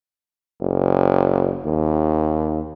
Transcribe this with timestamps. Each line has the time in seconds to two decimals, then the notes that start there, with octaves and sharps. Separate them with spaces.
0.61 F#1
1.65 D#2